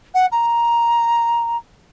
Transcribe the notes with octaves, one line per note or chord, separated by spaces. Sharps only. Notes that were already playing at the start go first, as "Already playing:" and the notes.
F#5
A#5